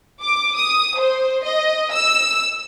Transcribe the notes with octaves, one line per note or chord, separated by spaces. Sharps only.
D6
D#6
C5
D#5
E6